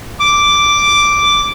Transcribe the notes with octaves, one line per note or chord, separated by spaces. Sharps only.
D6